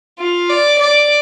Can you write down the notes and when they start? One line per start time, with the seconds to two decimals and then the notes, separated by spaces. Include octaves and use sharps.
0.19 F4
0.49 D5
0.80 D5